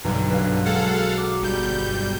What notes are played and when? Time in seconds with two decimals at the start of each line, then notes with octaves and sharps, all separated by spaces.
0.04 B1 G2 D3
0.30 B4 F5
0.65 G#3 F#4 A4 F5 F#5
1.17 D6
1.42 G1 G3 G6